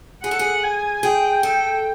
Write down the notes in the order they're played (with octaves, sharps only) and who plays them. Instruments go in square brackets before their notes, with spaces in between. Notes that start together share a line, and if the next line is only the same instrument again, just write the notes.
[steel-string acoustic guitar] G#4 [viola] F#5
[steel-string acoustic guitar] A4
G#4
[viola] G#5
[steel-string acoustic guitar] G#4 [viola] G5
[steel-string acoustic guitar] A4